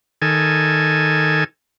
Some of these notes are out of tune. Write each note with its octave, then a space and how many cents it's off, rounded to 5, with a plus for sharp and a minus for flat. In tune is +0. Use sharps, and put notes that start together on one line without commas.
D#3 +0 A4 +0 G#5 +0